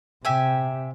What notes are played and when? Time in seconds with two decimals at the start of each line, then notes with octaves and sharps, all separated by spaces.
0.25 C3 G4 E5 G#5